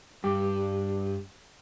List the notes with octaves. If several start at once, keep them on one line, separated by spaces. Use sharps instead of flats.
G2 G4